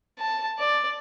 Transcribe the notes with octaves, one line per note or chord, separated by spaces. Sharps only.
A5
D5